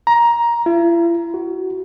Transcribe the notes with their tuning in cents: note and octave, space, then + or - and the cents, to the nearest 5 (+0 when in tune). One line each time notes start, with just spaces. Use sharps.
A#5 +15
E4 +45
F#4 +20